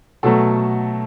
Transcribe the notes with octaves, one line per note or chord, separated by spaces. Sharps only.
B2 F#3 A3 A4